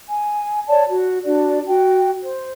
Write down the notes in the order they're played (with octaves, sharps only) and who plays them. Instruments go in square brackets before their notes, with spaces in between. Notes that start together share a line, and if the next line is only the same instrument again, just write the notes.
[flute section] G#5
C#5 D5 A5
F#4
D4 F#4 D5
F#4 G5
C5